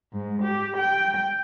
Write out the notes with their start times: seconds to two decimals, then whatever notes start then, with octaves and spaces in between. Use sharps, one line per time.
0.12 G#2
0.44 G4
0.77 G5